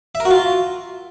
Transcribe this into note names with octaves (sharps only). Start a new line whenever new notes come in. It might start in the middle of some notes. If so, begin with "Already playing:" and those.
E5
A#4
F#4
F4